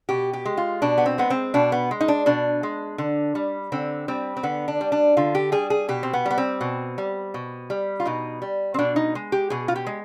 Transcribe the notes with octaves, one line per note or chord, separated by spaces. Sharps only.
B2 G4
G4
G#3
F4
B2 D4
B3
C4
G#3 B3
C4
B2 D4
B3
G#3
D#4
D4
B2 D4
G#3
D3
G3
D3 C4
G3 C4
C4
D3 B3
D4
G3
D4
D3 F4
G4
G3 G#4
G#4
B2 G4
C4
B3
G3 B3
C4
B2
G3
B2
G3
F4
B2 D#4
G3
C4
B2 D4
D#4
G#3
G4
B2 G#4
F4
G4
G#3